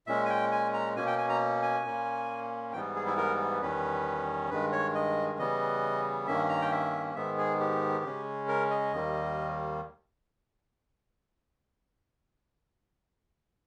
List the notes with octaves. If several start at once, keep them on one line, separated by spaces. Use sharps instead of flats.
A#2 G#3 C#4 E5
G#5
G5
G#5
A#5
B2 A#3 C#4 G#5
G5
G#5
A#5
G#5
A#2 A#3 C#4
G#2 E3 G3 B3 G5
G#4
E4
A#4
E2 D#3 G3 C#4 B4
G2 D#3 G#3 B4
C#5
D#5
C#3 E3 G3 B3 D#5
G2 D#3 A#3 C#4 E5
A#5
G5
E5
G#2 D#3 G#3 B3 E5
G#4
G4
C#3 G#3 C#4
A#4
D#5
D#2 D#3 G3 A#3